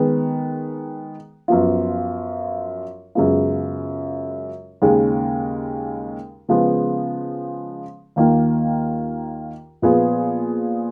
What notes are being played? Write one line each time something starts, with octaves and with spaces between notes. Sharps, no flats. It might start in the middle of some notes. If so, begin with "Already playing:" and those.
Already playing: D#3 G#3 B3
F#2 F3 B3 F4
F#2 C#3 G#3 B3 F4
D#2 C#3 G#3 D#4
C#3 F3 G#3 B3
D#2 D#3 A#3 F4
A#2 F3 B3 F4 G#4